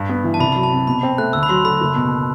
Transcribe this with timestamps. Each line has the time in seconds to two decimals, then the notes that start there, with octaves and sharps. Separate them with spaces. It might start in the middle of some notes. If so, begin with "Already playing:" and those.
Already playing: G2
0.09 B3
0.24 E3
0.34 A5
0.39 C2 B5
0.52 B5
0.55 F#3
0.63 A5
0.72 C3
0.87 B2 B5
1.03 C4
1.18 A3 F#6
1.33 D2 E6
1.43 B5
1.49 F#3 C6
1.65 D3 B5
1.81 F#1
1.96 B2